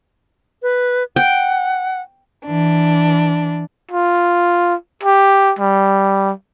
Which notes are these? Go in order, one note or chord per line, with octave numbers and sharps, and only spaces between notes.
B4
F#5 G5
E3 D4
F4
G4
G3